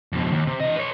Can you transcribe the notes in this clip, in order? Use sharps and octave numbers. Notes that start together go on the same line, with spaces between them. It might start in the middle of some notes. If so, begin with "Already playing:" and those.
F2 B2
D#2
C3
E3 D#5
B4 C#5